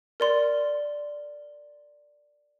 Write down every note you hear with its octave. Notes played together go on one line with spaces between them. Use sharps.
A#4 D5 C6